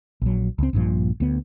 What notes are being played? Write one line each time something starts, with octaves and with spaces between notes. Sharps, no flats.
A#1 F#3
C#2 C4
A#1 G2 A#2 F3
D2 B3